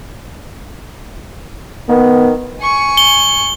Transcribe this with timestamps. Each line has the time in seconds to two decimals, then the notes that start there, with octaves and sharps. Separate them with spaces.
1.89 D#3 B3
2.62 G#5 C#6
2.97 G7